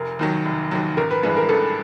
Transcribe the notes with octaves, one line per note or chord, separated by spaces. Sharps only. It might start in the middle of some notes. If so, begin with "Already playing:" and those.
Already playing: F1 A#4
D#2 D#3 F#3
F1
D#2 D#3 F#3
A1 A#4
B4
G2 E3 G#3 B4
A#4
A1 A4